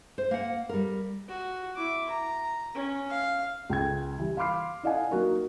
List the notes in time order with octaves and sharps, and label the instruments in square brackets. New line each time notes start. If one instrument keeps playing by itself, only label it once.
[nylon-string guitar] C5
A#3 F#5
G3 A#4
[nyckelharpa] F#4
E4 D6
A#5
C#4
F5
[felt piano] C#2 G5 G#6
E3 G3
F5 B5 C6 D6 F6 C7
E4 D5 D#5 F5 F#5 G#5
F#3 A#3 D#4 F#4 A#4